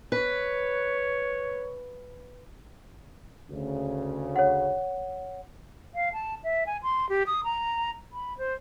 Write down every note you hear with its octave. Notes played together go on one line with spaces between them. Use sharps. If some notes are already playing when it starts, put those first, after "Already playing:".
B4 C#5
D2 C#3
C#5 F#5
F5
A5
E5
G#5
C6
G4
D#6
A#5
B5
C5